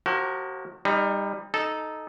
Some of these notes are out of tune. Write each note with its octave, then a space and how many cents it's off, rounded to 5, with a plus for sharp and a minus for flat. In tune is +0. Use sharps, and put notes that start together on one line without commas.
F3 +45 F#4 +40 A#4 +0
G3 +25 D#4 +0
D#4 +0 A4 -15